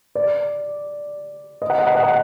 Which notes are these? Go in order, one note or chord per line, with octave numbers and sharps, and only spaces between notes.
D5
D#5
F#5
D#5
F#5
D#5
F#5